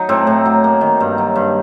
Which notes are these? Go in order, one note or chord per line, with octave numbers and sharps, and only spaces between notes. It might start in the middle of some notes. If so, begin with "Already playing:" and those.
Already playing: F#3 D#4
A2 C4
A2
F#3
A#3
D#3
G2
F#3
G2